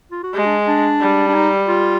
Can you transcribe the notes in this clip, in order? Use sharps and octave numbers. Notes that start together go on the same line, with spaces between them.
F4
F#4
G#3 G4
D4
D4
G3
D4
D#4
F4